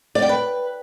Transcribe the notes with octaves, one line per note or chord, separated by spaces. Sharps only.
D5
G5
B4